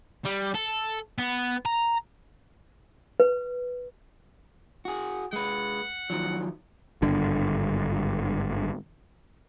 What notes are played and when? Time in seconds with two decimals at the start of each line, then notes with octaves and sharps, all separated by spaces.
0.25 G3
0.54 A4
1.18 B3
1.66 A#5
3.20 B4
4.85 F#4 G#4
5.33 G#3 B4 F#5
6.10 D#3 F3 F#3
7.02 G#1 G2 D3